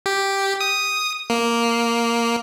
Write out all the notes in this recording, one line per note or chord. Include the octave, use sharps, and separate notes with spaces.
G4
D#6
A#3